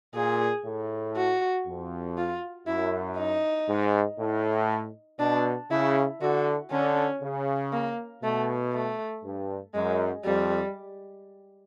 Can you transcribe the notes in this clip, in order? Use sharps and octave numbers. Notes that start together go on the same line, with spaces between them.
A#2 G#4
A2
F#4
F2
F4
F#2 E4
D#4
G#2
A2
B2 D4
C#3 E4
D3 F#4
D3 C#4
C#3
A#3
B2 A3
A3
G2
F#2 G#3
F2 G3